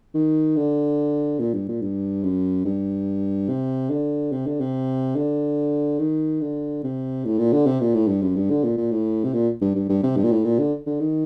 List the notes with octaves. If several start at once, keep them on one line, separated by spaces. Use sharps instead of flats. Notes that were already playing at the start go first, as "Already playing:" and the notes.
D#3
D3
A#2
G2
A#2
G2
F#2
G2
C3
D3
C3
D3
C3
D3
D#3
D3
C3
A2
A#2
D3
C3
A#2
A2
G2
F#2
G2
D3
A#2
A#2
A2
C3
A#2
G2
G2
G2
C3
G2
A#2
A2
A#2
D3
D3
D#3